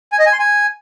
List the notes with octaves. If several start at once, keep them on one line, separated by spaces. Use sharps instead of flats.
G#5
D#5
G#5
C6
G#5